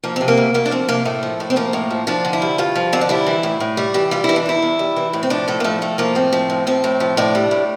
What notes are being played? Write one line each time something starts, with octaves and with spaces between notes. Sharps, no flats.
F3 A#3
C3 C4
A#3
D2
D2 A#3
D4
F3 C4
C3 A#3
A2 A3
F3
A2
C4
F3 A#3
A2
F3
F3 D4
D3
E4
G2
G2 F4
F3
D3 C4
D4
G3 E4
E3
A2
A2
G3
E3 G4
G3 F4
E3 E4
D4
E2 E4
E2
G3
E3
A2
C4
F3 D4
A2 A3
A#3
F3 A3
A2 A3
F3 A#3
A2 C4
F3
A2
F3 C4
A2
F3
A2 D4
G3
A2